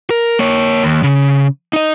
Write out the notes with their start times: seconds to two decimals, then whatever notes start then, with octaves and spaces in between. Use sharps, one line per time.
0.10 A#4
0.39 A#3 C#5
0.83 D#2
1.04 C#3
1.73 D#4 D#5